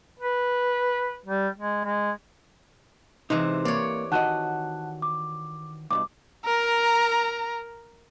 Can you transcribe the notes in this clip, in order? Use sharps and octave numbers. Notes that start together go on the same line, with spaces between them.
B4
G3
G#3
G#3
C3 E3 G#3 D#4
A#3 C#5 D5
D#3 F#4 D#5 F#5 A5 F#6
D6
C2 G2 B2 D6
A#4 A#5